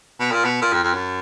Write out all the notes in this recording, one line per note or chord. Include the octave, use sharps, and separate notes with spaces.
B2
A#2
B2
A#2
F2
F2
F#2